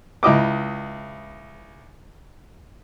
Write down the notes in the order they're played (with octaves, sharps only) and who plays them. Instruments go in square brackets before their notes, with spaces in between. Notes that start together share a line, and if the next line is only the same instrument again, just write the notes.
[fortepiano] C#2 E4 D#5 D6